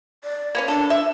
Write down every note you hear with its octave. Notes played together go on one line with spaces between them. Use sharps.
D5
A#3 B3 C#4
D4 A4
E5